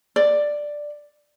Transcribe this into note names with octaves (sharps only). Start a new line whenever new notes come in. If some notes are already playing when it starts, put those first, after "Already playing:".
D5